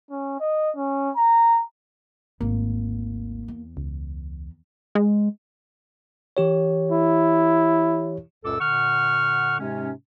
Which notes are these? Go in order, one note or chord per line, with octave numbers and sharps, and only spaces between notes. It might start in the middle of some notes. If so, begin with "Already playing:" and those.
C#4
D#5
C#4
A#5
G#1 D2 A#3
E2
C#2
G#3
E3 G4 C#5
E4
C#2 F#2 A#2 A4 D6 E6
A#2 D3 F#5 C#6 F6
G#2 C3 G#3 C#4